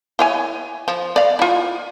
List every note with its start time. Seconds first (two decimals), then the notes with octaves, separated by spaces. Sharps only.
0.19 E4 C#5 G#5
0.88 F3
1.16 D5 F5
1.39 E4 F4